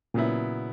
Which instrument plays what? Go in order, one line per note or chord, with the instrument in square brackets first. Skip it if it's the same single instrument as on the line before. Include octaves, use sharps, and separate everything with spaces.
[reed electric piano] A#2 [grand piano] C#3 F#3 B3 E4